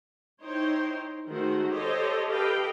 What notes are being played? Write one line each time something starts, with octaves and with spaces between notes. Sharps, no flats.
D#4 E4 C5 C#5 G5
D#3 G#3 A3 F#4 C5
G4 A4 C5 C#5 D#5
G4 A4 B4 D#5 F5 G5